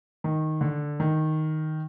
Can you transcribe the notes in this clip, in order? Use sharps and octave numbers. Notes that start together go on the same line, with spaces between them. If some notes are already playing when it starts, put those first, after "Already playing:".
D#3
D3
D#3